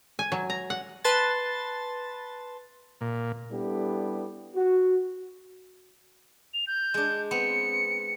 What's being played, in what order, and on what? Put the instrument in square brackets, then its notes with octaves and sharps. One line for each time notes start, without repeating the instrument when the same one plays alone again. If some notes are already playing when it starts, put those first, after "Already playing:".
[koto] G#5
F#3
A#5
F#5
[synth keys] B4 A5 C6 A6
[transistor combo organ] A#2
[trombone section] G3 B3 D4 E4 G4 A4
F#4
[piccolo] F7
G6
[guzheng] G#3 D4
[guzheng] B3 C4 [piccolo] C#7